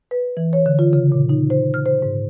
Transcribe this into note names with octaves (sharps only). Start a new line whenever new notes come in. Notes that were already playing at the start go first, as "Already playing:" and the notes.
B4
E3
C#5
D3
F4
C#3
A#2
D#4
C5
F6
C5
G#2